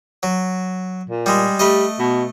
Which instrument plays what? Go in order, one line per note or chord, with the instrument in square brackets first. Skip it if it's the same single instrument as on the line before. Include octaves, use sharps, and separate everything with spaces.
[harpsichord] F#3
[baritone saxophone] A#2
[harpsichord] G3 G#3
[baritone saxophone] G3 [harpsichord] A3 D#5
[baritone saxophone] B2